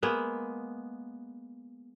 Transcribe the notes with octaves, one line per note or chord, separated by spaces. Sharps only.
G#3 A#3 B3